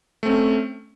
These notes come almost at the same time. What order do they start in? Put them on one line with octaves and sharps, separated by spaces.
A3 C4 C#4